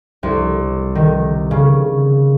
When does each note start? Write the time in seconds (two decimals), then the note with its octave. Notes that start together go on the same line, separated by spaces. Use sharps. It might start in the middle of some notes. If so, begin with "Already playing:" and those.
0.23 C2
0.95 D#3
1.51 C#3